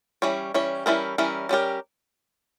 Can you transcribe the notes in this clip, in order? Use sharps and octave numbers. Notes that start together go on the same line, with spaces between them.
E3 G3 C#4 C#5
E3 G3 C#4 C#5
E3 G3 C#4 E4 A#4
E3 G3 C#4 E4 A#4
G3 C#4 G4 A#4